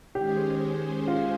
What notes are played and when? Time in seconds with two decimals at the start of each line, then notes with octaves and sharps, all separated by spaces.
0.15 D#3 G#3 C#4 G4 G#4 C5
1.08 F4